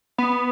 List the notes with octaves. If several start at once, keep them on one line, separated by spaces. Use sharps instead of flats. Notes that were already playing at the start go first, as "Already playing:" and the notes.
B3